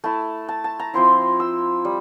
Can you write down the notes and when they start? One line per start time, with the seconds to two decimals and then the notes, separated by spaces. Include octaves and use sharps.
0.04 A3 E4 A5
0.48 A5
0.64 A5
0.79 A#5
0.94 F3 C4 E4 C6
1.40 E6
1.85 G3